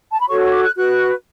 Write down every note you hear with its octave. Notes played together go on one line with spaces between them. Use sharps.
A5
B5
F#4 A4 C#5 C#6
C#6
D6
F#6
F#4 B4 F#6